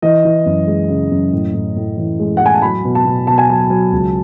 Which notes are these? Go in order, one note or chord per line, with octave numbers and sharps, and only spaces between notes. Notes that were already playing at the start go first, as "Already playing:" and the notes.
E3 D#5
E3
F#2
G#3
C#3
F#2
A2
A2
A2
E3
G#3
F#5
A2
G#5
A5
F#3 B5
B2
A5
B2
B2 A5
G#5
F#3 A5
F#3
C#2